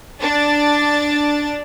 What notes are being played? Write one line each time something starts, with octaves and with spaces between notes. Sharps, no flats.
D4 A6